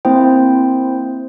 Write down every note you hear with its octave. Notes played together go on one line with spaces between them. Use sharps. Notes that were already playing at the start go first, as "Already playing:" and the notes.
A#3 C4 E4 C5 G5